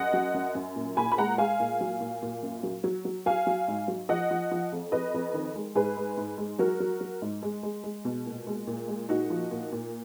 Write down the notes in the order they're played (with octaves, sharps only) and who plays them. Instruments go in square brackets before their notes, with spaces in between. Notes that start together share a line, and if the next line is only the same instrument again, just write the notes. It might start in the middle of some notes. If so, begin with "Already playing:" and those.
Already playing: [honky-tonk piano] F#2 D#5 F#5
F#3
F#2
F#2
A#2
A#2 G#5 B5
B5
G#3 F#5 A#5
G#3 F5 G#5
A#2
F#3
A#2
A#2
F#2
F#3
F#3
F#3
F#3 F5 G#5
F#3
G#2
F#3
F3 D#5 F#5
F3
F3
F2
F2 B4 D#5
F2
D#3
G#3
G#2 G#4 B4
G#3
G#2
G#3
F#3 F#4 A#4
F#3
F#3
G#2
G#3
G#3
G#3
B2
A#2
G#3
A#2
G#3
A#2 D#4 F#4
F3
A#2
A#2